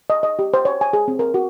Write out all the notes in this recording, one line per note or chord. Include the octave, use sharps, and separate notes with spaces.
D#5
D#5
G4
C5
C#5
G#5
G#4
C4
A#4
F#4